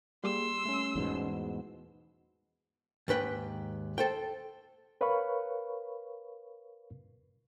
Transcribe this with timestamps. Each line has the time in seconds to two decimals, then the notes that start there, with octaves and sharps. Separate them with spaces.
0.24 G3 A#3 G4 G#4 C6 E6
0.65 A3 C#4
0.96 E2 G#2 B2
3.08 D#2 G#2 B4 G5
3.98 A4 C5 G5
5.01 A#4 B4 C#5 F5 B5 C#6